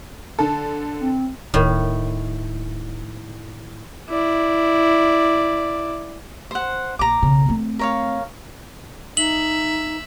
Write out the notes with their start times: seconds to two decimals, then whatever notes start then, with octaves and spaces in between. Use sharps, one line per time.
0.39 D3 A4
1.00 C4
1.54 D1 A2 D#3
4.09 E4 D5
6.51 C5 F#5
6.99 A#1 A#5 D6
7.23 B1 C#3
7.48 A3 C4
7.79 A#4 C#5 F5
9.17 D#4 E5 F#7